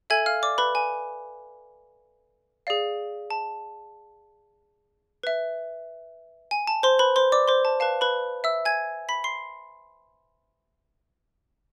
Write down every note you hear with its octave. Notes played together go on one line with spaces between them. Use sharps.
A4 E5 G#5 G#6
F5 F6
D5 D6
B4 B5
G#5
G#4 D5 F5
A5
B4 E5
G#5
A5
C5 C6
B4 B5
C5 C6
D5 D6
C5 C6
A5
B4 F5 A5
B4 B5
E5 E6
G#5 G#6
B5 B6
C6 C7